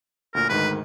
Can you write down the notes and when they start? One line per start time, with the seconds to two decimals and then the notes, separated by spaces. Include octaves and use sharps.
0.35 D2 A#2 A#4
0.49 D2 G#2 D#3 B4